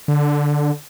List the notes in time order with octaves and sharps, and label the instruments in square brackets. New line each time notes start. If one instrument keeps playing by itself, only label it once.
[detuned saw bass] D3